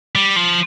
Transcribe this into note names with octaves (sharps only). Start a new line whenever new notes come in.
G3
F3